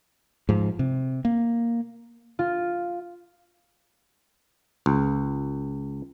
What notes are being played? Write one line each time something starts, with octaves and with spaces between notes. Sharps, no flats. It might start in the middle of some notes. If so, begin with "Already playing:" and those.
G#2 F3
C3
A#3
F4
C#2